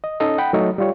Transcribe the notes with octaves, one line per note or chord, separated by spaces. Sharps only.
D#5
C#4 D#4 A4 D#5
F#5 G5 B5
F#3 A3 D#4 A4 C#5 D#5
G3 F4 C#5